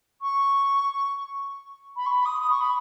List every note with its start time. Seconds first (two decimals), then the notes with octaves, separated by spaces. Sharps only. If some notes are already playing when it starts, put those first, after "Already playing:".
0.21 C#6
1.96 B5
2.06 C#6
2.10 B5
2.25 D#6
2.39 D#6
2.50 C#6
2.60 B5